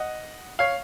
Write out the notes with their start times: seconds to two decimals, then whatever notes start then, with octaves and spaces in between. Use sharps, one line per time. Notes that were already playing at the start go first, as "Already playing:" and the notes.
Already playing: D#5 F#5
0.59 C#5 F5